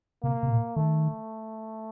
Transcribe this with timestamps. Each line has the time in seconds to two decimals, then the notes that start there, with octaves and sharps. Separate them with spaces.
0.23 C3 A#3
0.43 C3
0.50 A#2
0.76 D#3 A3